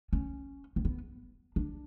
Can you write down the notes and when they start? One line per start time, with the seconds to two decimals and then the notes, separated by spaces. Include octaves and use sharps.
0.13 C#4
0.76 C4
0.85 B3
1.56 D4